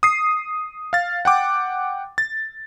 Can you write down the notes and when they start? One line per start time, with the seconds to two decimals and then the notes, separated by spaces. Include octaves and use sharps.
0.03 D#6 C7
0.93 F5 A6
1.25 F#5 G5 D6
2.18 A6